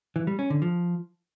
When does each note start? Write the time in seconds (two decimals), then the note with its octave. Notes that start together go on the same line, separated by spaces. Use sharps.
0.16 E3
0.27 G3
0.39 C#4
0.50 D3
0.62 F3